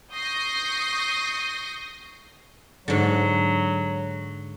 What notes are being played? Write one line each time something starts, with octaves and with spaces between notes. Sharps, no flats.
C#6 D#6 G6 A#6 C7
G#2 D3 F#3